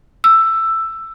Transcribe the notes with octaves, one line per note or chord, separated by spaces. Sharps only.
E6